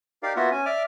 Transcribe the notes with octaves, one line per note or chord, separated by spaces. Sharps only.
D#4 G4 A#4 D5 F5
A#3 B3 F4 F#4 E5 F#5
C#4 G#5
D5 E5 D6 F6